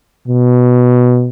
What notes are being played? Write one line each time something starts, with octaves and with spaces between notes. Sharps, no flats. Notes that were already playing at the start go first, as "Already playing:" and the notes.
B2